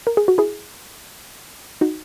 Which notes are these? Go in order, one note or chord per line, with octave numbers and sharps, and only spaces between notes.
A#4
G#4
F#4
E4 G#4
D#4 F#4